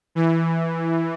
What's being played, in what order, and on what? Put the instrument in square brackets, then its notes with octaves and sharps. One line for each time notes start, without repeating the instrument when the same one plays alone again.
[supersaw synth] E3